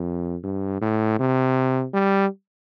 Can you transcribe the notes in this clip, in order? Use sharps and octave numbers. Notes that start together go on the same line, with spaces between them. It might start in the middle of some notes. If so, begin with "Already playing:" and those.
Already playing: F2
G2
A2
C3
G3